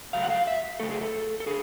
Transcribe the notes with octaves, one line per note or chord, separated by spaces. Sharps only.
C#3 F#3 A3 F5
F#5
F5
E5
C#3 F#3 A3 A4
G#4
A4
A4
D3 G#4